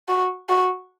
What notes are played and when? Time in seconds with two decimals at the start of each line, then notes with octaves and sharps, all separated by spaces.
0.09 F#4
0.49 F#4